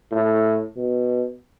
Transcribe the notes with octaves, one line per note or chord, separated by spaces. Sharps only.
A2
B2